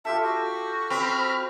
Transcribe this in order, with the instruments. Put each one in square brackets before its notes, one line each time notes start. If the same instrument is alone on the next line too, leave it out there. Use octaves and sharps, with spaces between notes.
[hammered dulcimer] F4 G4 A4 [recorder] E5
[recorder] F#4
[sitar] C4 [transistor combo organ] B5 F6